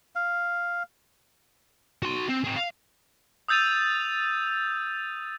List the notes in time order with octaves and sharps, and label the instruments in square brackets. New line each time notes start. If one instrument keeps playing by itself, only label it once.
[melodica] F5
[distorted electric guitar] F#4 C6
C4
C4 G#4
F5
[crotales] D#6 E6 G6 A6 D#7 F7